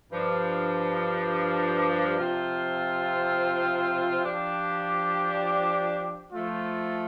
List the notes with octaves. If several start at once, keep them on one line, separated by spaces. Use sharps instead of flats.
G2 F3 D4
C3 F3 C4 F4
F3 D4 G4
F3 A3 F4